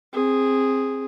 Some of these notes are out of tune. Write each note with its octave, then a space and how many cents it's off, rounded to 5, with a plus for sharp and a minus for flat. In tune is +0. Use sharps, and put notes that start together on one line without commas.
C4 +15 G#4 -5